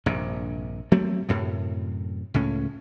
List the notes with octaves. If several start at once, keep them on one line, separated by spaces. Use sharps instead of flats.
A#1 G2 C3
F#3 A3 A#3 C4
F#2 A2 C3
C#2 A2 C#4